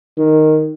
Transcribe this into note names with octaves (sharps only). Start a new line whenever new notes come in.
D#3